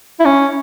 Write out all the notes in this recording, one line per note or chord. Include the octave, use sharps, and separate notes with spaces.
E4
C#4